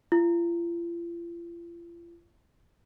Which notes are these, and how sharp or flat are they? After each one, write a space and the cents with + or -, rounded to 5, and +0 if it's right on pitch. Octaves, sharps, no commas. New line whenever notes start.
F4 -40